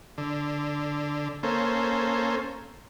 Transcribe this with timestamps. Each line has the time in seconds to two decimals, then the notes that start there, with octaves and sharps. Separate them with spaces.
0.18 D3
1.43 A#3 C#4 A4 C5